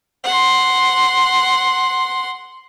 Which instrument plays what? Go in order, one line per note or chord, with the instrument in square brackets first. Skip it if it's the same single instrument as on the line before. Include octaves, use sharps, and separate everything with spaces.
[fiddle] F#5 C6